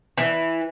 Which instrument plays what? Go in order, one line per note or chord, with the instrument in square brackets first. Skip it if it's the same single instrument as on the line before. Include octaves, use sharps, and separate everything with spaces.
[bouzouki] E3